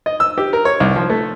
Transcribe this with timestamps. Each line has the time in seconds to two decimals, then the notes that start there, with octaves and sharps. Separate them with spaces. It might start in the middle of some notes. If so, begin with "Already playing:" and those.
0.06 D#5
0.20 E6
0.38 G4
0.53 A#4
0.65 C#5
0.80 C2
0.96 F3
1.10 A3